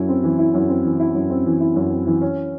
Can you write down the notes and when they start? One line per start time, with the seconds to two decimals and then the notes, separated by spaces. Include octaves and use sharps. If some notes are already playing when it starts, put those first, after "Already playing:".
Already playing: F#2 E4
0.09 C4
0.23 E3
0.39 E4
0.54 F#2
0.69 C4
0.85 E3
1.00 E4
1.15 F#2
1.30 C4
1.46 E3
1.61 E4
1.76 F#2
1.91 C4
2.06 E3
2.21 C#4